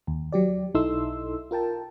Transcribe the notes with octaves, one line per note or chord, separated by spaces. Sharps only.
D#2
F#3 G4 D5
B1 D#4 E4 A4 C6 E6
F4 A#4 G5 A5